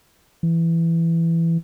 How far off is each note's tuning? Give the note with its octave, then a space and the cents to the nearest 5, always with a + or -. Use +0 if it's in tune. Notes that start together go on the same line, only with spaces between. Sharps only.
E3 +10